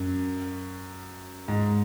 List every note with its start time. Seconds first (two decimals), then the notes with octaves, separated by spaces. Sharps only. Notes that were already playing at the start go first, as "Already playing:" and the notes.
Already playing: F#2 F#3
1.48 G#2